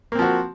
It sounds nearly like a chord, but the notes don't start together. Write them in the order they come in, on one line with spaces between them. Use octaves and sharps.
A#3 C4 F3 F#4